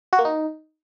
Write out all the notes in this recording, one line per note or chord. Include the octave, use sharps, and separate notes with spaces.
F#4
A#3
D#4